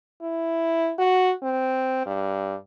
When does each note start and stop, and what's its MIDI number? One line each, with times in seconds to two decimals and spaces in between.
0.22 0.93 64
0.99 1.33 66
1.43 2.04 60
2.06 2.55 43